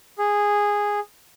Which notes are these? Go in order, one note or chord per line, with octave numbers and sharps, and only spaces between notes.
G#4